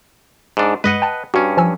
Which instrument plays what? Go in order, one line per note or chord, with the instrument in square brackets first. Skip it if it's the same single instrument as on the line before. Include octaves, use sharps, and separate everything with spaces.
[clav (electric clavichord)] G#2 D4
[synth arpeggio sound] G2 G#3 [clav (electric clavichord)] B4 D#5 F#5
[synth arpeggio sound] G5 A5
[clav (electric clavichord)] G2 C#4 [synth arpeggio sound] F#4
[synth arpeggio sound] F3 G#5 E6